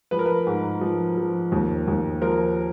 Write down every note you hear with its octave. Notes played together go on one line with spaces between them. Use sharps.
F3 B4
A#4
B4
G#2
F3
F3
D#2
D#2
F3 A#4 C5